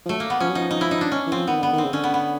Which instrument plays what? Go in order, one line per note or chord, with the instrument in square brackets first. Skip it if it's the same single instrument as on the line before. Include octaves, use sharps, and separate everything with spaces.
[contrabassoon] F3
[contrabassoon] F#3 [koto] A3
[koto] A#3
B3
[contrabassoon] F3 [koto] C#4
[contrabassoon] F#3
[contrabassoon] F3 [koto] D#4
[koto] D#4
E4
D#4
D4
C#4
[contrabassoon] E3
[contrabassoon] F3 [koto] C4
[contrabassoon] D#3 [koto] B3
[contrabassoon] D3 [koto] B3
[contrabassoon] D#3
[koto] C4
[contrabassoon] C#3
[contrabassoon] D3 [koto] C#4
[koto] B3
B3